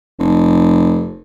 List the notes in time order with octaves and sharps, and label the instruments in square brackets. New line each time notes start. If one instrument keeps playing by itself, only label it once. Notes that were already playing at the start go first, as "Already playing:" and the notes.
[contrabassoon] F1